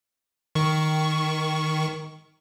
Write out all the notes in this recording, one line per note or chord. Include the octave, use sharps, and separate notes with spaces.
D#3 C#6